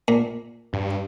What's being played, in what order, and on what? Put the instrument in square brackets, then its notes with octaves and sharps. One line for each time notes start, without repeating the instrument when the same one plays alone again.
[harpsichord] A#2
[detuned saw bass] G2